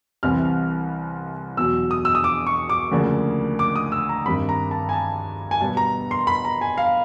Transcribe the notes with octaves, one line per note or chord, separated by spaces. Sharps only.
C2 C3 E3 G3 C4 F6
E2 B2 F#3 E6
D#6
E6
D#6
D6
C#6
D6
D2 C#3 F3 A#3 D4
D6
D#6
E6
A#5
G2 D#3 G3 C4 B5
A#5
A5
G#5
A5
G#5
B2 G3 B3 A5
A#5
C6
B5
A#5
G#5
F5